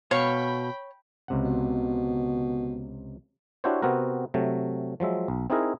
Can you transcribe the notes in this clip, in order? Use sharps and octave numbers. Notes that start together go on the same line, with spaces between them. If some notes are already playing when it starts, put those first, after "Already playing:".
B2 C#5 F5 G5 B5
C#2 C3 F#5
B2
D4 E4 F#4 G4 C5 C#5
C3 B3 C4 F#4 A#4
C3 F#3 A3
F3 F#3 G#3 E5
B1
C4 D#4 E4 G#4 A#4